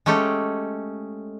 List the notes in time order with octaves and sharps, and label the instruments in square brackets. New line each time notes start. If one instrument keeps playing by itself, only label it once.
[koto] G#3 A3 C#4 G4 A4